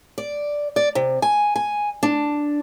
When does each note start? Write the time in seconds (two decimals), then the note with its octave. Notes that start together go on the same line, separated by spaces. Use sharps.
0.18 D5
0.76 D5
0.95 C3
1.22 G#5
1.56 G#5
2.03 D4